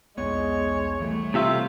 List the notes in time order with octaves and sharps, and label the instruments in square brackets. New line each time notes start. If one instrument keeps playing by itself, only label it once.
[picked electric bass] B1 E2 B3 [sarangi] G#3 [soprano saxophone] C#5
[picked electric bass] E3 G3 [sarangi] A3
[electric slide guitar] C3 G4 E5 [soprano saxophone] F4